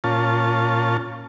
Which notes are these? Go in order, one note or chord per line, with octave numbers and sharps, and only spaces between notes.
A#2 C#4 F4 A5